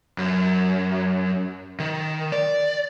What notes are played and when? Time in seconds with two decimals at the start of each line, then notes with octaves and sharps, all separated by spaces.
0.18 F#2
1.80 D#3
2.32 D5